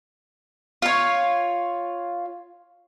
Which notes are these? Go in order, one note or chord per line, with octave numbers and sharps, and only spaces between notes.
F4 C#5